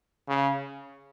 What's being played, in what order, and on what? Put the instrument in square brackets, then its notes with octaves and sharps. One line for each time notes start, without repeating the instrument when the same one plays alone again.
[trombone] C#3